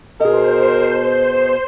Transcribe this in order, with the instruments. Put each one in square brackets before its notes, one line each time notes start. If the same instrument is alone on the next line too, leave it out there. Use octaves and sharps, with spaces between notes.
[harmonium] B2 [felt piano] G#4 D#5 [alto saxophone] A#4 [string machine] C5